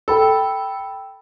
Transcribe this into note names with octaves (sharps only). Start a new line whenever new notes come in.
A4 G5 B5 E6